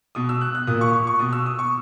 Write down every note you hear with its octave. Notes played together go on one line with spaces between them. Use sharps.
B2 D#6
E6
F#6
F#6
A#2 D#6
C#6
C#6
C#6
B2 D#6
E6
D#6
C#6